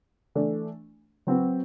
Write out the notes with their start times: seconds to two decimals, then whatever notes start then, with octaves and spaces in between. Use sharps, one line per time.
0.35 E3 A3 D4
1.27 F#3 C4 F#4 B4